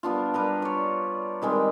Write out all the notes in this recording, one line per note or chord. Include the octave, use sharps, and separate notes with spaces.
G3 B3 D4 F4
G3 B4 A#5
C#5 D5
D#3 G3 G#3 C4